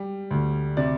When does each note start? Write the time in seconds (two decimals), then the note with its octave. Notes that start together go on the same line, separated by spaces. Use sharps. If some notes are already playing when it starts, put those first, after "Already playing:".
Already playing: G3
0.31 D2
0.77 C3 D5